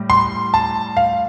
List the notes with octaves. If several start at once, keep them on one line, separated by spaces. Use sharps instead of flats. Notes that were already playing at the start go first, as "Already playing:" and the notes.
Already playing: A2 G3
C6
A5
F5